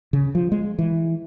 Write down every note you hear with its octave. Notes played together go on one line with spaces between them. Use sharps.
C#3
F3
G#3
E3